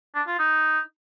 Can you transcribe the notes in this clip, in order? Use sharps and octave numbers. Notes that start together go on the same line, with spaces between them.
D4
F4
D#4